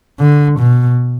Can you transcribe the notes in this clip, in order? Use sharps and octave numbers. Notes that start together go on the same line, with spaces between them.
D3
B2